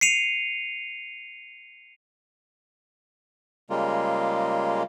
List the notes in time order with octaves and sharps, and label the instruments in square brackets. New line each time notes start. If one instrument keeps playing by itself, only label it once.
[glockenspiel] C7 C#7 D#7 F7
[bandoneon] C#3 G3 G#3 A#3 F4